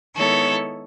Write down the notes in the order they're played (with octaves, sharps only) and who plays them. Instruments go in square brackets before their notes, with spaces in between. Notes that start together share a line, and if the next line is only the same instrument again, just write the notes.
[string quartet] D#3 G#3 B3 E4 A4 C#5